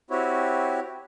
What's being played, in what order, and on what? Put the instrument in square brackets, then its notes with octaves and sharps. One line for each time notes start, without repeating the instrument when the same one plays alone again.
[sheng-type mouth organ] C4 E4 F#4 G4 C#5